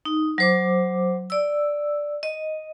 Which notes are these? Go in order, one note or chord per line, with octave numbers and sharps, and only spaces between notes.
D#4
F#3 C5 D6
D5 E6
D#5